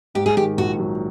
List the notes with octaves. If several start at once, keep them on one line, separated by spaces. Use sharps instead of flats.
G#2 G4
G#4
D#3 G4
A#1 F#4
F#3